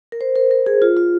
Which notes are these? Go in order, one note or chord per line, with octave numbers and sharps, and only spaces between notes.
A#4
C5
A#4
A#4
G#4
F4
F4